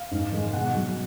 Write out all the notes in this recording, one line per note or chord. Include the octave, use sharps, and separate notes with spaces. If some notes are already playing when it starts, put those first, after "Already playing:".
Already playing: F5
G#2
D#3 G#3
B2 F#5
F#3